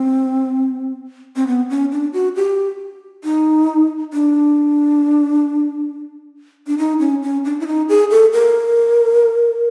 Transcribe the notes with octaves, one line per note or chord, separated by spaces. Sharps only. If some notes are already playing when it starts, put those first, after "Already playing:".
Already playing: C4
C4
B3
C#4
D4
F#4
G4
D#4
D4
D4
D#4
C#4
C#4
D4
E4
D#4
G#4
A4
A#4